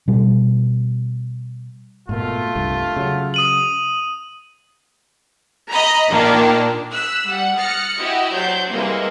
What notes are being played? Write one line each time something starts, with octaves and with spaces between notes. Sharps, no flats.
B2 G3
G#2 B2 A3 A#3 F4
C2 G2
C#3 F#3
D#6 D#7 F#7
D#5 A#5 B5
A#2 D#3 A#3 D4
E6 F#6 B6
G3 F#5
D#6 F6 F#6 A6 A#6 C#7
E4 F#4 G4 D#5
F#3 D4 C5 G6
C3 E3 G3 G#3 A#3